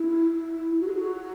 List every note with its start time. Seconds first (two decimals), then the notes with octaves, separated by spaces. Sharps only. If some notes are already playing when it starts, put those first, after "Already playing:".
Already playing: E4
0.80 F#4
0.87 G#4
0.94 F#4